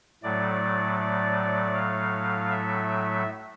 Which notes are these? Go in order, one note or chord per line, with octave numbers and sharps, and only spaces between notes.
A2 F#3 A3 D5
D5
F5
E5